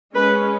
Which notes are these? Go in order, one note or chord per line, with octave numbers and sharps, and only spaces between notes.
G#3 C#4 B4